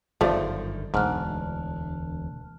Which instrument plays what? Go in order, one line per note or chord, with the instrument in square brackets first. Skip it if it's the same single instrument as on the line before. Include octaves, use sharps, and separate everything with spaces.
[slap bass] G1 F#2 D#3 [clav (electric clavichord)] F3 [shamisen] G3 A3
[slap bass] E1 D2 [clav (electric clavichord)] G#2 [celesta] A5 F6 F#6